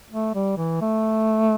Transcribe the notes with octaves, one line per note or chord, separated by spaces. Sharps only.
A3
G3
E3
A3